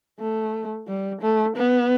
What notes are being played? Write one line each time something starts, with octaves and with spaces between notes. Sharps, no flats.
A3
G3
A3
B3